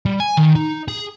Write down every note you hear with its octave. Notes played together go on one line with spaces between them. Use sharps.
G3
G#5
D#3
D#4
G#4